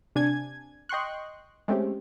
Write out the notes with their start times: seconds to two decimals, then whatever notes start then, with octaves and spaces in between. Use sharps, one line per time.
0.15 C3 D4 G#5 G#6
0.89 D#5 G5 C6 C#6 F#6
1.68 G#3 A3 C4 C#4 G4